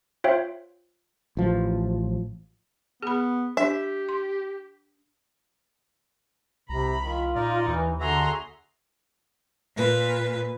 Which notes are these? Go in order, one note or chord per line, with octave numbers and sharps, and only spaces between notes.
F4 C5 C#5 E5 F5 G5
A1 F3
B3 G#4 B5
D4 G4 E5
C6
C2 C3 A#5 B5
D#3 F4
A#2 D#4 A#4 D5
D#2 E3
D3 F#4 G#4 E5 A#5 C6
A#2 B4